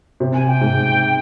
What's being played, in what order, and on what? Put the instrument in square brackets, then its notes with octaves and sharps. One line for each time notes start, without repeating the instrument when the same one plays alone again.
[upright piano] C3
[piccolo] G#5
G5
[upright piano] G#2